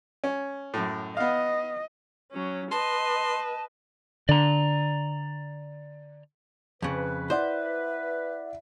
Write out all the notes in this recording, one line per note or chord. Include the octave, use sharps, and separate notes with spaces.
C#4
F#2 A2
B3 D#5 F5
F#3 C#4
B4 D#5 A5 C6
D3 D5 A#5
F2 C#3 B4
E4 C5 D5 E5 F#5